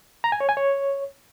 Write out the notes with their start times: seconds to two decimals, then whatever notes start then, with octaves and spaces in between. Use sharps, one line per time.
0.24 A#5
0.32 G#5
0.40 C#5
0.49 G#5
0.57 C#5